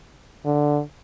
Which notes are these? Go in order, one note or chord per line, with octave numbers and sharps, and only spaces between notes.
D3